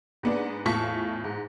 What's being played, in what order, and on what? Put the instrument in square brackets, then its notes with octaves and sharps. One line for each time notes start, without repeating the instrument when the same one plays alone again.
[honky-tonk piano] G#2 B3 D4
E2 A2 F4 A5 C#6 B6
G#2